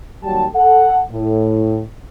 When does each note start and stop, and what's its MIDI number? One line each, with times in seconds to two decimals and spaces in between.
0.24 0.46 39
0.24 0.46 54
0.24 0.46 55
0.24 0.46 67
0.24 0.46 79
0.24 0.46 81
0.55 1.01 69
0.55 1.01 78
1.11 1.82 45